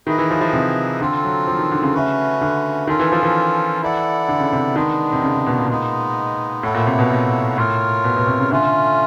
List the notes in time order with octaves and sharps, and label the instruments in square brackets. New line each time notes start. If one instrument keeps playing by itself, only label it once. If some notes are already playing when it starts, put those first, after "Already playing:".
[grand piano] D#3 [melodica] E4 G#4 B4 D#5
[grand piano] E3
F3
F3
C3
[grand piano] D3 [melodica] C4 F4 A4
[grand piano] F#3
F3
D#3
D3
C#3
[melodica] A3 C#4 F#4 B4
[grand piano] D3
[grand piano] D#3 [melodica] C#4 F4 A4
[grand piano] E3
F3
E3
[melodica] E4 A4 D5 F#5
[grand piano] D3
C#3
C3
[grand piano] D#3 [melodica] G#3 B3 D4
[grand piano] C3
C#3
C3
B2
A#2
[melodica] G#3 B3 D#4
[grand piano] A2 [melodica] E4 A4 C#5 F#5
[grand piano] A#2
C3
B2
A#2
[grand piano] A2 [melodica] F4 A#4 C#5
[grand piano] B2
B2
C3
C#3
[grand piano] D3 [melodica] A3 C#4 F4